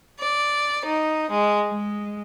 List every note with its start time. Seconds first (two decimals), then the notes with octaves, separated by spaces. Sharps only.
0.21 D5
0.87 D#4
1.30 G#3
1.71 G#3